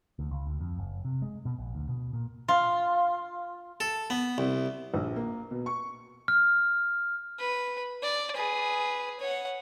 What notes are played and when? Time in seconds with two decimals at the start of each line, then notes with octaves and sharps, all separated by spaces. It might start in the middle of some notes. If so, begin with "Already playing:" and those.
0.19 D2
0.31 C#2
0.47 D2
0.60 F2
0.79 F#1
1.05 C3
1.22 G#3
1.45 B2
1.58 A#1
1.75 D2
1.89 B2
2.13 A#2
2.48 F4
3.80 A4
4.10 B3
4.38 C2
4.94 A#1
5.16 A#3
5.51 B2
5.66 C#6
6.28 F6
7.39 B4
8.03 D5
8.35 G#4 B4
9.20 C#5 F#5